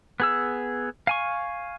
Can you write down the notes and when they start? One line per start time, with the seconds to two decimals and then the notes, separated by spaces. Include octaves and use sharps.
0.20 B3 G#4 E6
1.07 F5 G#5 C#6